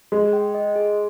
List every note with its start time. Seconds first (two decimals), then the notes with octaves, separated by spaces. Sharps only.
0.12 G#3 G#4
0.33 G5
0.55 D#5
0.76 G#4